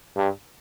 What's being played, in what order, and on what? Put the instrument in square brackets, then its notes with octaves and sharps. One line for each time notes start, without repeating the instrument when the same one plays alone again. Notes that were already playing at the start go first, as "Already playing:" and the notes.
[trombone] G2